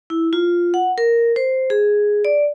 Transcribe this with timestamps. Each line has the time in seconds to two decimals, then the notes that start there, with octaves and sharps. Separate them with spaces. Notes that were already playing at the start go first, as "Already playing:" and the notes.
0.10 E4
0.33 F4
0.74 F#5
0.98 A#4
1.36 C5
1.70 G#4
2.25 D5